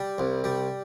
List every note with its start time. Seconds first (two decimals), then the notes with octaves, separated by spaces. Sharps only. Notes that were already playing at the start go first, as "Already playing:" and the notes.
Already playing: G3
0.18 C2
0.44 G3